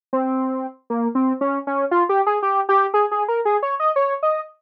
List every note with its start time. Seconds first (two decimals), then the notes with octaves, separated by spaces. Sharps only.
0.13 C4
0.90 A#3
1.15 C4
1.41 C#4
1.67 C#4
1.91 F4
2.09 G4
2.27 G#4
2.43 G4
2.69 G4
2.94 G#4
3.11 G#4
3.28 A#4
3.45 G#4
3.63 C#5
3.80 D#5
3.96 C#5
4.23 D#5